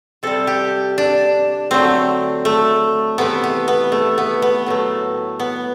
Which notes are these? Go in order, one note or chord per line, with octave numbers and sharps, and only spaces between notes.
C3 G3 A4
G4
D4
D3 F#3 A3 C4
A3
C3 E3 A3 B3
B3
B3
A3
B3
B3
A2 F#3 A3
B3